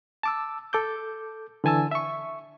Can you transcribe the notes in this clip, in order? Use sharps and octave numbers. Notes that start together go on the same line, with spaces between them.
A5 D6 E6
A4 D6 G6
D3 E3 G#5 A5 E6
E5 C#6